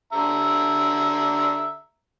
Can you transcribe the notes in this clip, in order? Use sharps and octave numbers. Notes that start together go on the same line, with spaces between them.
D3 E5 A#5